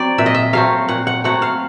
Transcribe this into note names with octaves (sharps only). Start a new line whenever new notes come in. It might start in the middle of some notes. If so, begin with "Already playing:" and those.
Already playing: F#3 C4 D5
A#2 E5
D#5
E5
F#3 A3 C4 F5
A#2 F#5
F#5
F#3 A3 C4 F#5
F5